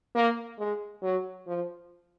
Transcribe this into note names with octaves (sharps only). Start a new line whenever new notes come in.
A#3
G#3
F#3
F3